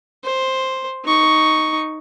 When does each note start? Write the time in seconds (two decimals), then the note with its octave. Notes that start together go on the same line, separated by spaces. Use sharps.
0.23 C5
1.05 D#4 C#6